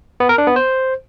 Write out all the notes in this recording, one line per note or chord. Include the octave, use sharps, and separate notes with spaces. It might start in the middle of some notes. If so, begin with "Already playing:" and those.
B3
A#4
D4
B3
C5